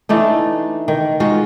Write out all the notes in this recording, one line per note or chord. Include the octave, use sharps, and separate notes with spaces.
E3 A3 D4 D#4
D#3
G#3 D#4 F4 F#4